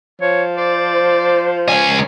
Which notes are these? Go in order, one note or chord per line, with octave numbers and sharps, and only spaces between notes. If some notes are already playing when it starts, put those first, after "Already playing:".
F3 C#5
C5 D5
C#2 C#4 G#5